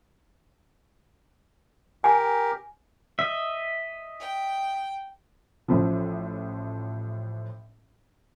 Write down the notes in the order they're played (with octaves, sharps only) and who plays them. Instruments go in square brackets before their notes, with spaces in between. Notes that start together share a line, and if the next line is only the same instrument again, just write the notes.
[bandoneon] G4 A#4 [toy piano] G#5
[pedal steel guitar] D#5 E5
[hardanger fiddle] G5
[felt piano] A1 A2 F3